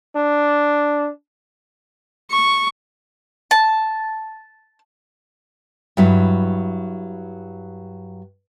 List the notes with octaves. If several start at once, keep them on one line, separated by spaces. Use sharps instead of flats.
D4
C#6
A5
G2 F#3 E4